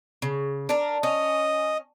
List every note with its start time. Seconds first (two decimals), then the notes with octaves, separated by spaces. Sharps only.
0.22 C#3
0.69 D4 A#4
1.03 C#4 D#5